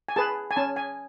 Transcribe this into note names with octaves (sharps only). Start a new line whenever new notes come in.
G#5
G#4 B4 A5
G#5
C#4 A5
G#5